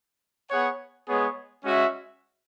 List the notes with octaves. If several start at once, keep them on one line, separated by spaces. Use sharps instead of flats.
B3 G#4 C#5 F#5
G#3 B3 G#4 C#5
G#3 C#4 F#4 E5